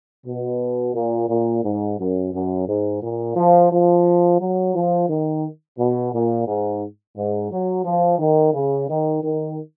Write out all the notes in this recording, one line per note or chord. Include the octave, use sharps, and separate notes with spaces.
B2
A#2
A#2
G#2
F#2
F#2
G#2
A#2
F3
F3
F#3
F3
D#3
B2
A#2
G#2
G#2
F#3
F3
D#3
C#3
D#3
D#3